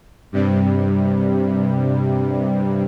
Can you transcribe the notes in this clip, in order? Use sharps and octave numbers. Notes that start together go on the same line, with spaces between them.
G2 C3 G3